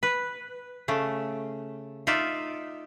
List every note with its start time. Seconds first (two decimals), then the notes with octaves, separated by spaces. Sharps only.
0.03 B4
0.88 C#3 A3
2.07 D#4 F4 D5 E5